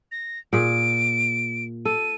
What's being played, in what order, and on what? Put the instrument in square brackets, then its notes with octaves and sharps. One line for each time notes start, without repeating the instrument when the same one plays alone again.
[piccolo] A#6
[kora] A#2 G#4 [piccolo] D7
[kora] A4 [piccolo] D#7